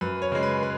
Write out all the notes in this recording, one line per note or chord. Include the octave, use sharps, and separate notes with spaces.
F#2 B4
C#5
C#3 G#3
B4
B4